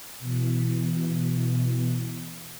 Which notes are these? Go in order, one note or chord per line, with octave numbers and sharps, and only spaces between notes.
B2 E3